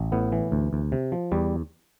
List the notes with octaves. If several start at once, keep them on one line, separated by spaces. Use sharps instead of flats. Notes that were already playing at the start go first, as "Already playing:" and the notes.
Already playing: A1
A2 B3
E3
D2
D2
C3
F3
E2 G3